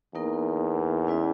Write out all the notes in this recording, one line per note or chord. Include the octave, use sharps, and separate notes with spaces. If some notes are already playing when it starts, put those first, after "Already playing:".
E2 A#3 D#4 A#4
C#4 E4 B4 D#5